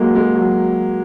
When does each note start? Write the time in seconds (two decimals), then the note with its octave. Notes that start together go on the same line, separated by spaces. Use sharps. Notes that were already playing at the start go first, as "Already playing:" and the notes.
Already playing: F#3 G#3 A#3
0.15 G#3
0.35 F#3